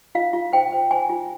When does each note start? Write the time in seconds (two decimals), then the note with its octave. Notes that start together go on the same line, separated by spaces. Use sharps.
0.15 F4 F5
0.33 F4
0.53 C5 G5
0.72 C5
0.91 C5 G#5
1.09 F4